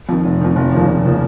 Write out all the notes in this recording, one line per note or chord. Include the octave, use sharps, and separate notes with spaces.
F2 D#3
F1
F2 D#3
F1
D#2 C#3 F3 A#3
F1
C#3 F3 A#3